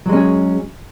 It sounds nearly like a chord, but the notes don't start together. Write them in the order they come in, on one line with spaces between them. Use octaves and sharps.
F#3 G#3 C#4 G#4